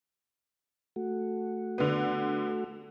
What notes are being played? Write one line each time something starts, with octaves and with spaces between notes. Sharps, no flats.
A3 F#4
D3 B3